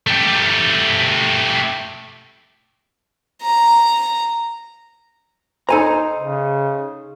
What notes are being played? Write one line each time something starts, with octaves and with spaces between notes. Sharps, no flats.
A3 G4
A#5
D#4 A4 C5 G#5 A#5
C#3